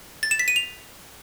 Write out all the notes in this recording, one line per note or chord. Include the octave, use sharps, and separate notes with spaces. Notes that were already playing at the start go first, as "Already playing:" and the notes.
A6
E7
B6
D#7
F7